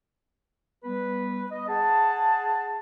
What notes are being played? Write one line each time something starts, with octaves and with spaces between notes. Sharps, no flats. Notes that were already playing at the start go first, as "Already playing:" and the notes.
G3 B3 B4
D#5
G#4 F#5 A5